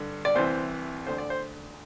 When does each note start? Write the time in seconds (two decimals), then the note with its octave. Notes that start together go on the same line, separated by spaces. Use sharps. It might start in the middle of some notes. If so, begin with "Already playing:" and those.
Already playing: G2 D3
0.25 D5
0.35 C2 C3 E3 C5
1.06 D2 D3 C5
1.18 D5
1.30 C5